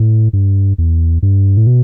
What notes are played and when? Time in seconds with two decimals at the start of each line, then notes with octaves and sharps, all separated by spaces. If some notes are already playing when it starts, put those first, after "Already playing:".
Already playing: A2
0.33 G2
0.78 E2
1.23 G2
1.57 A2
1.67 B2